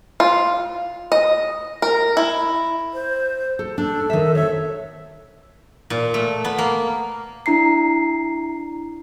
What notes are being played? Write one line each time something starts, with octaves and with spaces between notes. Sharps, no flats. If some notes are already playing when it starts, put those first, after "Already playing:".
F4
D#5
A#4
E4
C5
A4
D4 A4
D#3 E5
A4 C#5 E5
A#2
A3
B3
A#3
D4 E4 A#5 C7